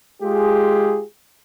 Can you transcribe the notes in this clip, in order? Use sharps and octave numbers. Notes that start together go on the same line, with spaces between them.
G#3 F4 G4 G#4